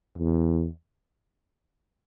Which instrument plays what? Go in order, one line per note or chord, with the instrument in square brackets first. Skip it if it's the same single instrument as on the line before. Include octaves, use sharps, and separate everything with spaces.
[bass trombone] E2